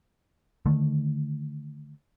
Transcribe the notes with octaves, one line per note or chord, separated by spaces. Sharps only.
D3 D#3 A3